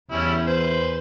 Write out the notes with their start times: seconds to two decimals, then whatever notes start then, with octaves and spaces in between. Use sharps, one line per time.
0.12 E2 G3 C#4 E4
0.48 B4 C5